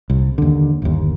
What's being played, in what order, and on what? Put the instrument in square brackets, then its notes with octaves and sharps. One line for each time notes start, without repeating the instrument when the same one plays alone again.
[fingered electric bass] C2
D#2 D3
G1 D#2